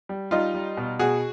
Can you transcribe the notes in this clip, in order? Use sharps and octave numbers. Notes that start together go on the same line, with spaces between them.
G3
G3 D#4 F4
G3
B2
B2 F#4 G#4